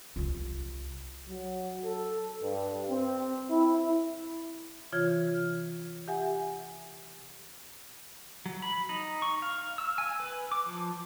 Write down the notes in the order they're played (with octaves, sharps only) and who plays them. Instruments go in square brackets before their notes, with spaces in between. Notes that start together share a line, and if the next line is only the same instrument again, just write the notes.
[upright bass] C2 F4
[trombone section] F#3
A4
G2
C4
E4
[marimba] C3 E3 F4 C#5 F6 G#6
G4 E5 F#5 G#5
[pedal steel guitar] F#3
B5
D#4
C#6
F5
E6
G#5
B4
D6
F3